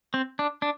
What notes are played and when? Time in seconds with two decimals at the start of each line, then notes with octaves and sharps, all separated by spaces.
0.14 C4
0.39 D4
0.62 D4